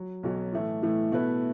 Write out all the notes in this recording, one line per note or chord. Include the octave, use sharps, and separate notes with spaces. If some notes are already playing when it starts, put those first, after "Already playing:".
Already playing: F#3
B1 B2 F#3
A2 E3 A3
A2 E3 A3
B2 A3 E4 B4